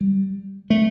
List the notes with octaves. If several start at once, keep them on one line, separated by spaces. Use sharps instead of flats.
G3
A3